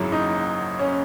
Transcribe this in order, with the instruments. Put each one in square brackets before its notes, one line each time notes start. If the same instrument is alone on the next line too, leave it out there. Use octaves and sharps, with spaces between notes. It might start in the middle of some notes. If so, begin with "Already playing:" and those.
Already playing: [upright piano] G#1 F#2 C#3 F#3 E4
D#4
C#4